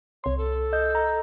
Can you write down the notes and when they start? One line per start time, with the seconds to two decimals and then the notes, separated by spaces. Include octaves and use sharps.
0.24 C2 C#5 C6
0.37 A4
0.73 D#5 G6
0.95 D#5 A#5